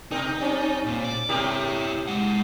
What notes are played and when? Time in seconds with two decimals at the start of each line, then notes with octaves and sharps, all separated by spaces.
0.11 B2 D#4 A#4
0.40 G3 C4 C#4
0.86 A#2
1.04 D5
1.29 B2 E4 G4 A#4 C#5
2.08 G#3 F#5